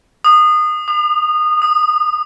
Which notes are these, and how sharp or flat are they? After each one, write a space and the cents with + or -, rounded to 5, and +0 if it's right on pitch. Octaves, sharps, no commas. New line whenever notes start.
D#6 -25
D#6 -45
D#6 +10